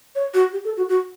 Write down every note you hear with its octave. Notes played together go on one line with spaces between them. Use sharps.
C#5
F#4
G4
A4
F#4
F#4